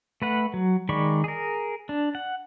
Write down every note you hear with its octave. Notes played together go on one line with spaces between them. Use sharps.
A3 B4 F#5
F#3
D#3 G#3 D5 B5 C#6
G#4 A#4
D4
F#5